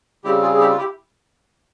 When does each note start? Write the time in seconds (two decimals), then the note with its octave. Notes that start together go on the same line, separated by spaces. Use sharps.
0.24 C#3 G3 C4 E4 G4
0.42 F4 G#4
0.53 G#4
0.60 E4 G4
0.71 F4
0.77 E4 G4